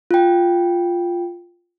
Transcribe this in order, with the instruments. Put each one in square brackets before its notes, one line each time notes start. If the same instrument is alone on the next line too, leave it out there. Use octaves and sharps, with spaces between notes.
[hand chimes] F4 G5